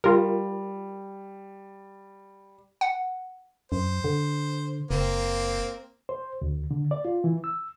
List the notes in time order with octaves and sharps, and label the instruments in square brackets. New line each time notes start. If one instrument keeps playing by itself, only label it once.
[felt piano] G3 [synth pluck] F4 A#4
[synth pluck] F#5
[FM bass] F#2 [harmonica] C5
[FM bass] D3
[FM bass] F#1 [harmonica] A#3 C4
[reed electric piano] C5
D2
D3
D5
F4
E3
E6